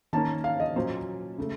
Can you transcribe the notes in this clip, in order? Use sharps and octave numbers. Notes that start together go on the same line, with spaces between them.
D#3 A#3 C#4 A5
F5
D#5
A#2 F#3 A#3 C#4 C5
C#3 A3